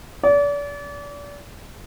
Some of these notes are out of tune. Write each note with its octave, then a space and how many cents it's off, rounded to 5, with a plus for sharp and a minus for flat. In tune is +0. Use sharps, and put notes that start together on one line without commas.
D5 -35